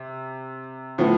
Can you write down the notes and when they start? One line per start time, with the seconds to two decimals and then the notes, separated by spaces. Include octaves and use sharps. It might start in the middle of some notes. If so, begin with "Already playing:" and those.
Already playing: C3
0.98 A2 F3 B3